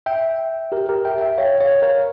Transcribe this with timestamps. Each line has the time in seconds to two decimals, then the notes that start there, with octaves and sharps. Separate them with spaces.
0.06 E5 G5
0.72 G4 A#4
0.89 G4 A#4
1.05 E5 G5
1.21 E5 G5
1.38 C#5 F5
1.61 C#5 F5
1.82 A#4 C#5